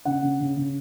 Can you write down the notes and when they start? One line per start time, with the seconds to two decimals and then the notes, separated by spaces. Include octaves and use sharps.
0.05 C#3 F#5
0.22 C#3
0.40 C#3
0.57 C#3